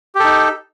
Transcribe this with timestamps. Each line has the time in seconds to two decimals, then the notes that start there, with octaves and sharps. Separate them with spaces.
0.15 G4
0.20 A4
0.24 D#4